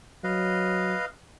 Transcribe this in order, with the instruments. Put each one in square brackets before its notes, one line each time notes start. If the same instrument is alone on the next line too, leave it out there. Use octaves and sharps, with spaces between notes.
[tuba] F#3 [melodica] B4 D#5 F5